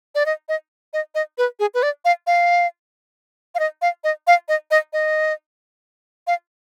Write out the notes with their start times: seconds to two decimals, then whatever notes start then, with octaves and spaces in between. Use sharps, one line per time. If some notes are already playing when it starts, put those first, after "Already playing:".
0.15 D5
0.26 D#5
0.49 D#5
0.93 D#5
1.15 D#5
1.38 B4
1.60 G#4
1.74 B4
1.83 D5
2.05 F5
2.27 F5
3.55 F5
3.59 D#5
3.82 F5
4.04 D#5
4.27 F5
4.48 D#5
4.71 D#5
4.93 D#5
6.27 F5